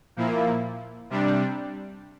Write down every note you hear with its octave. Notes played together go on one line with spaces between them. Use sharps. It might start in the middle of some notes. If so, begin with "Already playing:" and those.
A#2 F3 A#3 E4
C3 G3 D4